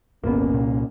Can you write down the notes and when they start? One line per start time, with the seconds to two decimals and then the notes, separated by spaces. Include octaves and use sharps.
0.24 D#1 G#1 A#3 B3 C#4
0.53 C2 A#2